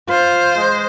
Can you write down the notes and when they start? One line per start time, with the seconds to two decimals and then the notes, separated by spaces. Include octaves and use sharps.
0.09 F4 C5
0.56 G#3